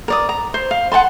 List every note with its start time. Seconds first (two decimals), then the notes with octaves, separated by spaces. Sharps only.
0.08 A#4 D5 D#6
0.29 A#5
0.54 C5
0.71 F5
0.92 F#5 G5 A5 C6